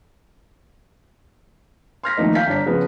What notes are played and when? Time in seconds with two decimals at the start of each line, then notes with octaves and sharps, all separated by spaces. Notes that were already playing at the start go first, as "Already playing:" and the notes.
2.03 C6 F6 A#6 B6
2.17 D#3 F3 A3 A#3 D#4
2.35 F5 G6 B6
2.47 G1 D4 B6
2.66 C#3 F3 B3